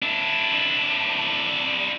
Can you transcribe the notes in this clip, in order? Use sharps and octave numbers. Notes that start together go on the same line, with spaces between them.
D4 E4